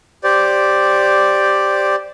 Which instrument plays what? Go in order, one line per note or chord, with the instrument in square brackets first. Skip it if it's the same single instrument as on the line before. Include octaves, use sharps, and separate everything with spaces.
[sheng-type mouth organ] G4 C5 D5